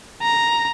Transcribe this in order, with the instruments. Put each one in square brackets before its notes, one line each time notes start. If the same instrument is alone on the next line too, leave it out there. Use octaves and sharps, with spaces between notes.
[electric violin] A#5